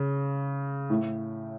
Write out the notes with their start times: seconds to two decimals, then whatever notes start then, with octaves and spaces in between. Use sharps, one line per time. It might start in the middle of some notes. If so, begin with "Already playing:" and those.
Already playing: C#3
0.90 A2